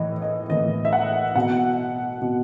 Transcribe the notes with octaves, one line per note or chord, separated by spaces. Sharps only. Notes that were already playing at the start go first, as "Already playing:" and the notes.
Already playing: A2 E3 D#5
D#5
A2 E3 D#5
E5
F#5
B2 F#5
B2